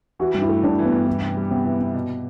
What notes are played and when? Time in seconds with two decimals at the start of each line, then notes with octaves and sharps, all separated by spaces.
0.19 E3 F#4
0.34 G2
0.42 E4
0.49 A3
0.63 G2 D4
0.79 E3
0.85 B3
0.92 G2
1.07 E3
1.21 C3
1.37 G3
1.50 C3 B3
1.65 E3
1.80 C3
1.94 B2